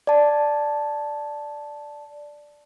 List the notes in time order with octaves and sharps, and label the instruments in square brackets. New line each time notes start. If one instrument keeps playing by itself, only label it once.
[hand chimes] D5 A5